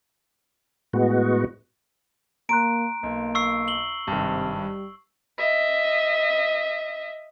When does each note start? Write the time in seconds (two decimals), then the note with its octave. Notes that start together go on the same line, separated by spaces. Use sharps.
0.93 A2 G#3 B3 F#4
2.49 A#3 A#5 C6 F#6 D7
3.03 B1 A#3
3.35 C#6 E6 C7
3.68 F#7 G7
4.08 G#1 G2 C3
4.58 G3
5.38 D#5 E5